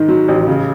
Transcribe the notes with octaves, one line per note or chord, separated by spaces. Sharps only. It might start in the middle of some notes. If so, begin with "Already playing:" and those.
Already playing: G#2 D#3
F#3
A1
C#3